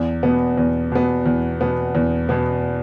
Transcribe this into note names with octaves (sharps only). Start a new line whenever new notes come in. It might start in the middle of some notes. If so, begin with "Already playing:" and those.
Already playing: E2
B2 B3
E2
B2 B3
E2
B2 B3
E2
B2 B3